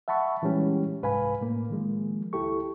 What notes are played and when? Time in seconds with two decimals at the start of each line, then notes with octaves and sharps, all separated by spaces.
0.08 E5 F#5 A5 B5 C#6
0.42 A#2 E3 G3 G#3 C#4 G4
1.02 C2 G#2 B4 F5 G#5 B5
1.41 A2 A#3
1.70 D#3 F3 G#3 A#3
2.33 C#2 E4 G4 A4 C#6